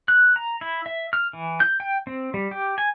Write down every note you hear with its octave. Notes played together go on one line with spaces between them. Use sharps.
F#6
A#5
E4
E5
F6
E3
G6
G5
C4
G3
G4
G#5